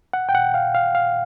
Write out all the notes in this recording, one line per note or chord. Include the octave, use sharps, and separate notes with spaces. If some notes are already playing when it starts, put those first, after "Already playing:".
F#5
G5
F#5
F5
F5
F5